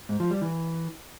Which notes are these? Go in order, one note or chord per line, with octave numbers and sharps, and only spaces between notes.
G#2
F3
G3
E3